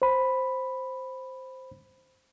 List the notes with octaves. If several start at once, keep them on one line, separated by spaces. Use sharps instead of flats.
C5 B5